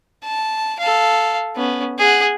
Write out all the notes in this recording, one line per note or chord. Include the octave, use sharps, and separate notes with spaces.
A5
A4 F5
B3 C#4
G#4 F#5